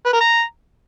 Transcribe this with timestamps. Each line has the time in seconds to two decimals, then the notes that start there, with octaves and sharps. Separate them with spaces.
0.05 B4
0.13 A#4
0.21 A#5